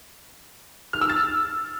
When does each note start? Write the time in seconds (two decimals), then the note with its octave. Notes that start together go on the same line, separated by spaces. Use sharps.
0.93 F6
1.01 E6
1.10 A6